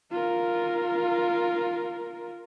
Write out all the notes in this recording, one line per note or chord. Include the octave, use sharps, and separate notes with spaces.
F4 A#4